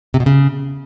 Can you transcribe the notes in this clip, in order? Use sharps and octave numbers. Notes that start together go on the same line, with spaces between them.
C3
B2
C#3